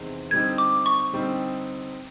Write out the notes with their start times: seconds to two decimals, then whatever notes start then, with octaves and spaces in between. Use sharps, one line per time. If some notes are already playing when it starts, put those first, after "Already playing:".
Already playing: E2 C3 D#3 G#3 C4
0.31 D3 G3 C4 D#4 G4 G#6
0.58 D6
0.86 C#6
1.13 D3 G3 C4 D#4 G4